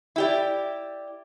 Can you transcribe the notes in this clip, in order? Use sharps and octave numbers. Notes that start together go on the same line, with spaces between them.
E4 G4 D5